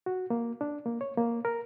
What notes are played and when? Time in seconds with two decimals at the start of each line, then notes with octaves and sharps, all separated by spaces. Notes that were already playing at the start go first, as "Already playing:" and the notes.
0.06 F#4
0.30 A#3
0.61 D4
0.86 A#3
1.01 C#5
1.17 A#3
1.45 A#4